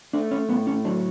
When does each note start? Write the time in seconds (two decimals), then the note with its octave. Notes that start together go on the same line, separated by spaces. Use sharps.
0.13 A3 D4
0.31 C#4
0.49 A2 B3
0.67 C#4
0.85 F#3 D4